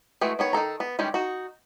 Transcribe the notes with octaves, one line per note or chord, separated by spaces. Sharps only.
E3 G#3 A3 F#4
D#3 B3 C#5
D#3 D#4 A4 A#5
B3
D#3 G3 G#3 C#4
D#4 F#4